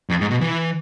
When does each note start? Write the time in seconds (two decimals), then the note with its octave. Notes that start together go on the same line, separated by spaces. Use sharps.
0.10 F2
0.21 G#2
0.30 B2
0.41 E3